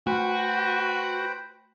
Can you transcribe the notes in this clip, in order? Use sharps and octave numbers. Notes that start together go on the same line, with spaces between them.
A3 F#4 B4 C5 G5